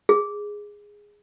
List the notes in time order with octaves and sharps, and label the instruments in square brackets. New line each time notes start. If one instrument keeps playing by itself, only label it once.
[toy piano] G#4